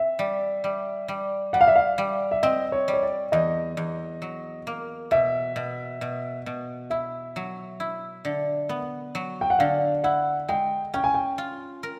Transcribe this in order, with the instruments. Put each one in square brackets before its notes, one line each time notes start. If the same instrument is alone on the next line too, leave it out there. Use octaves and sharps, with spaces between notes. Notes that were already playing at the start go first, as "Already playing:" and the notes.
Already playing: [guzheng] C4 [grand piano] E5
[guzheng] G3
G3
G3
[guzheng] G3 [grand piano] F#5
[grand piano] F5
E5
F5
[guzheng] G3
[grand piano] E5
[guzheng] C4 [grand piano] D#5
[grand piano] C#5
[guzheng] G3
[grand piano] C#5
D5
[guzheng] E2 [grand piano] D#5
[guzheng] E2
F#3
A#3
[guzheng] B2 [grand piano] E5
[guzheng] B2
B2
B2
[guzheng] E4 [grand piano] E5
[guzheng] F#3
E4
D3
B3
F#3
[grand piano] G5
F#5
[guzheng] D3 [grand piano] F5
[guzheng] E4 [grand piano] F#5
[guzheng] G#3 [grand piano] G5
[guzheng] C#4 [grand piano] G5
[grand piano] G#5
G5
[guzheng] F4
A#4